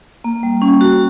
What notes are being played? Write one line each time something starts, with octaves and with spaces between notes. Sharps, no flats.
A#3
G3
C#4
F#4